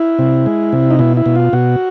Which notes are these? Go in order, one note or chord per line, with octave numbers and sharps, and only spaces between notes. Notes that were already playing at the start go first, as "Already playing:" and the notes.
Already playing: E4
C3
G#3
C3
D#4
B2 E4
E4
B2
F4
B2 F#4